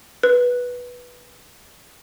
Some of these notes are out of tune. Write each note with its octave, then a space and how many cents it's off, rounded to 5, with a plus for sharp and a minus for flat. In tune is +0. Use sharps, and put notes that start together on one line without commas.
B4 -10